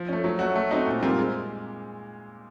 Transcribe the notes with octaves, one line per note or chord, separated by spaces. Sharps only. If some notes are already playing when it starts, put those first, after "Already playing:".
Already playing: F3
A3 C#4
F#3
A3 C#4 F#4
A3
C4 D#4 F#4
A#2
G3 C4 F4 A#4
G#3